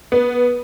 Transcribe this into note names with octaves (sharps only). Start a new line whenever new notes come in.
B3